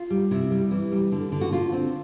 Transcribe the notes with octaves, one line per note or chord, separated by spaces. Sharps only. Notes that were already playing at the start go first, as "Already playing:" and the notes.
Already playing: F4
G3
C3 E4
G3
E3
G3
D3
D3
F#4
D3 F4
C4